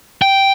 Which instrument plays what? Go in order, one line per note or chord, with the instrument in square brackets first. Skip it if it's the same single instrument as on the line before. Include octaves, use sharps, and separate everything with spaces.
[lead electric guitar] G5